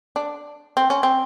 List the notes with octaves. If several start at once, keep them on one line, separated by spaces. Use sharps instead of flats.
D4
C4
C#4
C4